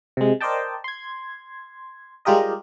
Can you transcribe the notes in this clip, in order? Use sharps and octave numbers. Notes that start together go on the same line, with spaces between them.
C3 G#3
A#4 C5 D5 D#5 G5 A5
C6 G#6
G3 G#3 F4 G4 A#4 D#5